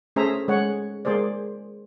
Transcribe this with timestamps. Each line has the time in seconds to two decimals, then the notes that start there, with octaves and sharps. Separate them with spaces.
0.16 A3 C#4 G#4 C5 E5 A#5
0.48 G#3 C#5 F#5
1.05 G#3 A#3 G#4 C5 D5